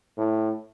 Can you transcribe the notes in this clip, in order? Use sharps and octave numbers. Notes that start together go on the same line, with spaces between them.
A2